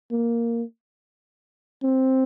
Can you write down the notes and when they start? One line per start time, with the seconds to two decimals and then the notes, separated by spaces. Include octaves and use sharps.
0.12 A#3
1.83 C4